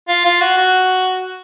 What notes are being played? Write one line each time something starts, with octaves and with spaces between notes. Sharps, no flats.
F4
F4
F#4
F#4